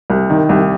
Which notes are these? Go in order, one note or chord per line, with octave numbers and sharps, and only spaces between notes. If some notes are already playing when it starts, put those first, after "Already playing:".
C2
D#3
C2